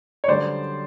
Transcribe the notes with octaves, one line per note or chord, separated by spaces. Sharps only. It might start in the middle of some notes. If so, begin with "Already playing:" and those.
C#5
F#2 D3 G3 C5 D5